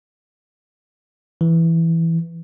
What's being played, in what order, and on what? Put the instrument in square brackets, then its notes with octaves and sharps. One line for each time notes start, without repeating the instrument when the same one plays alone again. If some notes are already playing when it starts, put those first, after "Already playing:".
[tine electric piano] E3